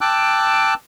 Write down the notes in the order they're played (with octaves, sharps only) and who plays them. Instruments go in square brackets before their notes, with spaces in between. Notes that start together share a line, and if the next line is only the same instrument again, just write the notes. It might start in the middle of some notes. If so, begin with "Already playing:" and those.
[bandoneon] G5 A5 D6 E6 F#6